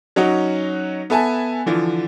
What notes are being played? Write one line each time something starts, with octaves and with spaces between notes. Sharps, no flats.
F#3 C#4 D#4 F#4
B3 A4 E5 G#5 A5
D3 E3 F3